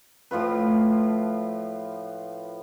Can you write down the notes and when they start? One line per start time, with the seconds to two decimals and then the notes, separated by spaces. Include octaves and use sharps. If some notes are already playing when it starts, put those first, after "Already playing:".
0.31 A2 F3 F4 B4